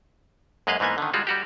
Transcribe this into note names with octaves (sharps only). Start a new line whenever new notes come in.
F#2 G#3 A#3 B4 D#5 F5
G#2 E3 A#3 B3 G#5
D3 D#3
G3 G#3 F4 F#4
G3 F#4 G4